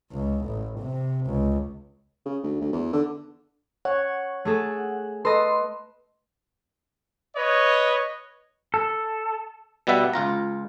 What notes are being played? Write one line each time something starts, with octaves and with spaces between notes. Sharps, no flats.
C#2
A1
C3
C#2
C#3
D2
D2
E2
D3
C#5 F#5
A3 G#4 A4
A4 B4 D#5 C6
B4 C#5 D#5
A4
B2 G3 B3 E5 F#5
C#2 F4 A#5